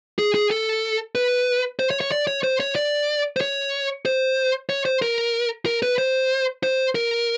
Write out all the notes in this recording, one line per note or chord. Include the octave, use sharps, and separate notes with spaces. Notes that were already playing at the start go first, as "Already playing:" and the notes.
G#4
G#4
A4
B4
C5
C#5
C#5
D5
C#5
C5
C#5
D5
C5
C#5
C5
C#5
C5
A#4
A#4
B4
C5
C5
A#4